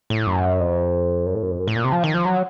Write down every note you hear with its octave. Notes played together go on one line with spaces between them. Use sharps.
A2
F#2
F2
F#2
A2
F#2
F2
F#2
A2
A#2
C3
F3
D#3
F3
F#3